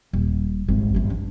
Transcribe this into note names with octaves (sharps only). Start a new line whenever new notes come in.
D#1
G#1 C3
G1 E3
D4